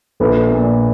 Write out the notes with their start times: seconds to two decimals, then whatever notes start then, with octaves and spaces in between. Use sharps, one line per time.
0.20 A#1 A4 B4
0.51 A#2